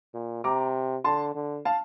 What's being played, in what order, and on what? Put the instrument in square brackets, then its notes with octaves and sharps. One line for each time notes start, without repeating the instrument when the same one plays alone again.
[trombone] A#2
[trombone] C3 [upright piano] A#5 D6
[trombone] D3 [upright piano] A5 C6
[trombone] D3
[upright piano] F5 A5